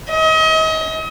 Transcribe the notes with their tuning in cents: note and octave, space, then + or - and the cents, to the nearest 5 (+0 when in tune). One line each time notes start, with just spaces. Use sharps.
D#5 +35